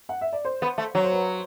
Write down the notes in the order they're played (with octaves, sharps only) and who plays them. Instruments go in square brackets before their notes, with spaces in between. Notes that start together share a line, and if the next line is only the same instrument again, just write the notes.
[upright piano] F#5
E5
D5
C5
[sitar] B3
A3
F#3
[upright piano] C5
B4